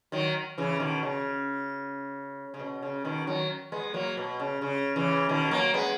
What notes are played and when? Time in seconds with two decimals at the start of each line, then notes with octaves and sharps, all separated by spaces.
0.12 D#3 F#3
0.58 C#3 E3
0.80 B2 D#3
1.03 C#3
2.54 C#3
2.59 B2
2.82 C#3
3.05 B2 D#3
3.27 D#3 F#3
3.72 G#3 B3
3.94 F#3 A#3
4.17 B2
4.40 C#3
4.62 C#3
4.96 C#3 E3
5.29 B2 D#3
5.51 F#3 A#3
5.74 G#3 B3